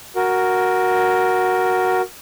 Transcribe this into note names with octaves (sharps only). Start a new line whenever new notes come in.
F#4 A#4